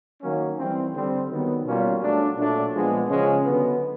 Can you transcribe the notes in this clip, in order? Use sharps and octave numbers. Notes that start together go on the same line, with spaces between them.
D#3 F#3 A#3 C#4
E3 G3 C4
D3 G3 C4
D#3 F#3 B3
B2 G3 A#3 C#4 F4
F#3 A3 D4
A#2 F#3 A3 D4
A#2 F3 G#3 B3
C#3 F3 G#3 C#4
D3 F#3 B3